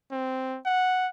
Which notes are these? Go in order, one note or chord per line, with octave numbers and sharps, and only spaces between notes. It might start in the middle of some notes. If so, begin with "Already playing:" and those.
C4
F#5